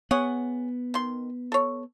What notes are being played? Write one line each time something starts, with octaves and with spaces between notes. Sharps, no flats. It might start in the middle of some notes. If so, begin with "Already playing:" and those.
B3 G#4 C#5 F#5
D#3 C6
A4 C#5